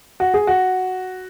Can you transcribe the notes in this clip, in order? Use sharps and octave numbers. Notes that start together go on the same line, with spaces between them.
F#4
G#4
F#4